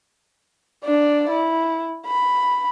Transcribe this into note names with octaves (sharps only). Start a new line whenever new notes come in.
D4 D5
E4
B5